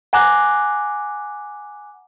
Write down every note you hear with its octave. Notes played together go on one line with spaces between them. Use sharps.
F#5 G#5 A#5 D6 F#6